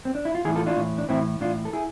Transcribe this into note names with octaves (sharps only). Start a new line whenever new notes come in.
C4
D4
E4
F4
A2 E3 E4 G#4
F4 A4
D4 F4
A2 E3
D4
A2 E3 C4 E4
A2 E3 D4 F4
A4
E4 G#4